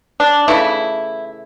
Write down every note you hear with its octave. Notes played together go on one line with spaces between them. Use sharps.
D4
C#3 E3 A3 E4